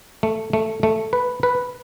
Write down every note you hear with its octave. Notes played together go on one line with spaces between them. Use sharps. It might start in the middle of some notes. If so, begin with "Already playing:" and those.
A3
A3
A3
B4
B4